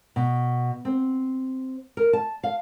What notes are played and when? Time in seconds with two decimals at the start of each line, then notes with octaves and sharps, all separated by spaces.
0.16 B2
0.85 C4
1.97 A#4
2.13 A5
2.43 F5